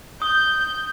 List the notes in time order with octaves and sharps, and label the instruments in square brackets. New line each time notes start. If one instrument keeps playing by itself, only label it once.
[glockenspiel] D#6 [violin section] G6